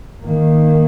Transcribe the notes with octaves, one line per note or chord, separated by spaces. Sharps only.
D#3 A#3